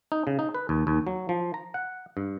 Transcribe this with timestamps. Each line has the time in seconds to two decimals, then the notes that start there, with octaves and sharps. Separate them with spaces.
0.12 D#4
0.27 C#3
0.39 D#4
0.55 B4
0.69 D#2
0.87 D#2
1.07 F#3
1.29 F3
1.54 A#5
1.74 F#5
2.17 G2